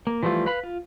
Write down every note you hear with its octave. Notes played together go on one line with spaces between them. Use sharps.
A#3
E3 F3 G3 A3 F4
B4 F5 B5
F4